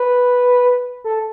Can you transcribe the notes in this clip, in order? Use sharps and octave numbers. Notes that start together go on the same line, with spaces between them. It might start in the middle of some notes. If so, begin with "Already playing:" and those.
Already playing: B4
A4